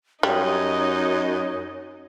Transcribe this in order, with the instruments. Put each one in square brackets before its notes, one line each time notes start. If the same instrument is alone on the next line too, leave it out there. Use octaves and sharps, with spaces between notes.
[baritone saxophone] F#2 [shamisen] G3 [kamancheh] D#4 D#5 [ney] C#5